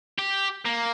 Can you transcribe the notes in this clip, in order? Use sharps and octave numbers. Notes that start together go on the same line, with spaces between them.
G4
A#3